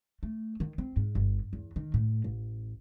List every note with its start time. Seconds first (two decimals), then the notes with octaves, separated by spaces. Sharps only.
0.23 A3
0.60 D#3
0.78 C4
0.96 G#2
1.15 G1
1.53 E2
1.76 D#3
1.94 A2
2.24 A1